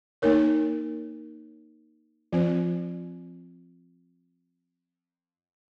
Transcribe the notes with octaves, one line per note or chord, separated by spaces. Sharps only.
A#3 D#4 A#4 C#5
F3 C4 F4 C5